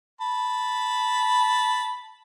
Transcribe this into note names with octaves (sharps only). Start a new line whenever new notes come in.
A5 B5